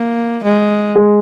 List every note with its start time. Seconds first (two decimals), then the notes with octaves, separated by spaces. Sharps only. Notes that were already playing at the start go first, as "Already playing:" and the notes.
Already playing: A#3
0.44 G#3
0.95 G#3